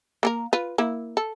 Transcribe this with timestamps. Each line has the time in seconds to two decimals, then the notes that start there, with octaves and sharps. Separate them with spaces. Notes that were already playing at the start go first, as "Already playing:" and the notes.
0.23 A#3 A4 A#4
0.53 F4 B4
0.78 A#3 E4
1.17 A4